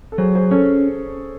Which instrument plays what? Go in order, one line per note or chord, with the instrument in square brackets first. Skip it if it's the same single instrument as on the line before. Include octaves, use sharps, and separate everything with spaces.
[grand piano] A4
[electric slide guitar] F#3 [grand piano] G#4 C5
[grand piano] G#4 C5
[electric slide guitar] C#4 [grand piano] A4 C#5